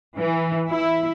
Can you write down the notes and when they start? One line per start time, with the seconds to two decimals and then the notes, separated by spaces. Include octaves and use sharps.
0.18 E3
0.70 E4